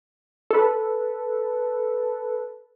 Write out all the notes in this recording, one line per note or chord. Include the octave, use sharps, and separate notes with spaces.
A4 B4